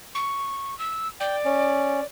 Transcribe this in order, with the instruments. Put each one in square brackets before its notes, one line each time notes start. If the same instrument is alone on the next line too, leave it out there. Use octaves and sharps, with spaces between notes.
[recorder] C#6
E6
[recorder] D5 [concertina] G5
[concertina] C#4